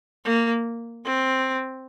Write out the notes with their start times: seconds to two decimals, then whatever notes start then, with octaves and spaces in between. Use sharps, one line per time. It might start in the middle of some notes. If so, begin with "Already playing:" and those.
0.25 A#3
1.05 C4